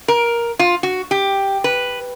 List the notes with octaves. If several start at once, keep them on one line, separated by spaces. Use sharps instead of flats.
A#4
F4
F#4
G4
B4